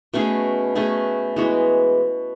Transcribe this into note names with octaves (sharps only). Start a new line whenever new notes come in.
B2 A3 C#4 G#4
B2 A3 C#4 G#4
E3 G#3 B3 F#4